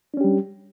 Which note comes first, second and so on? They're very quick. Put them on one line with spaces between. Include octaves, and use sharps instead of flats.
D4 C#4 G4 G3